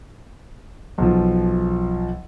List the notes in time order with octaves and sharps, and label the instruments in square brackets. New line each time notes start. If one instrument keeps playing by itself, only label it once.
[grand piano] B1 F3